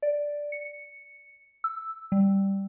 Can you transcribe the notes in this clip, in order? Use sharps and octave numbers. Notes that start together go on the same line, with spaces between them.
D5
C#7
E6
G3